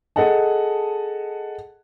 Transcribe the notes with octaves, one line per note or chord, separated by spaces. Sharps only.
G#4 A4 D#5 F#5 A5